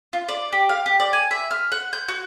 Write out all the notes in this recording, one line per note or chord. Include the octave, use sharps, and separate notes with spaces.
F4
D5
G4
F5
G4
D5
G#5
E5
F6
F#5
G6
F#4